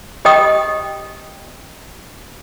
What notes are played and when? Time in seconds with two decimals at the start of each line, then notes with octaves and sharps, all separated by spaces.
0.25 G4 D#5 G5 D#6